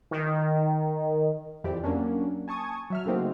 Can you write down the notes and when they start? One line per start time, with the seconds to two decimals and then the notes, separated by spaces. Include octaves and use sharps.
0.11 D#3
1.64 F2 E3 C4 G4 D5
1.84 F#3 A#3 C#4 D4
2.48 G#5 A5 C#6 D#6 G#6
2.90 F#3 E5 F6
3.05 C#3 A3 A#3 C4 D#4 F#4